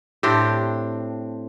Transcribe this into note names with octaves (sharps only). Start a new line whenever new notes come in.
A2 C4 D4 G4